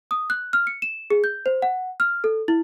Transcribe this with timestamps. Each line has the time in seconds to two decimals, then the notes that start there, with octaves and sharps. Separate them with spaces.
0.11 D#6
0.30 F#6
0.53 F6
0.67 C#7
0.82 E7
1.10 G#4
1.24 G6
1.46 C5
1.62 F#5
2.00 F6
2.24 A4
2.48 E4